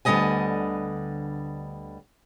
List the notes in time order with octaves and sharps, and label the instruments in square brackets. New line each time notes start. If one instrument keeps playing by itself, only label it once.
[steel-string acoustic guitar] D2 D3 G3 B3 D#5 G#5